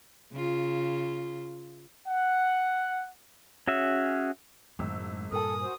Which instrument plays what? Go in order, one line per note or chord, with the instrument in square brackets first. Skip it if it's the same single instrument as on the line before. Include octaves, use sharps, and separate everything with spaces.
[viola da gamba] C#3 F4
[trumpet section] F#5
[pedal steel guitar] C#4 F#4 G#4 E5
[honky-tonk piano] G#1 E6 [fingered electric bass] F#2 A2
[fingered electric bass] G2 A#2 [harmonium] A4 [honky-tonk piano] A#4 G#5 [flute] D#6
[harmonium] F#4 C5